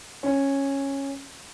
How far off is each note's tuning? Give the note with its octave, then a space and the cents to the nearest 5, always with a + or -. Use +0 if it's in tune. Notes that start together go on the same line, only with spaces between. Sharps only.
C#4 -10